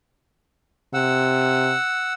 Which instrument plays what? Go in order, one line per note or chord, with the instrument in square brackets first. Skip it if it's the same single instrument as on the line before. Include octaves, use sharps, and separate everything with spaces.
[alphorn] C3 [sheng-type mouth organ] F#5 E6